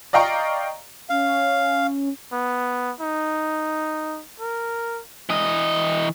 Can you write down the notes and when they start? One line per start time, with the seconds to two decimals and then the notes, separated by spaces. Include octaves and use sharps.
0.13 D5 D#5 F5 G5 A#5 C#6
1.10 C#4 F5
2.32 B3
3.01 D#4
4.40 A#4
5.30 E3 D#5